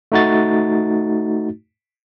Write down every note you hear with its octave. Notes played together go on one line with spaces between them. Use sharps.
A3 D#4 F#4 A6